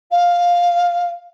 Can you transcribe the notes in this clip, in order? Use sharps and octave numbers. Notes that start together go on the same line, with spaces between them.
F5